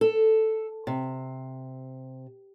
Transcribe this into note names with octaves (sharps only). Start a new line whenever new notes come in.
A4
C3